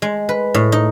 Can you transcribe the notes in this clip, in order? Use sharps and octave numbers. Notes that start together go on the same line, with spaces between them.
G#3
B4
A2
D#4